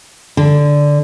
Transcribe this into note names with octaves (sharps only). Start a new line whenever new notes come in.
D3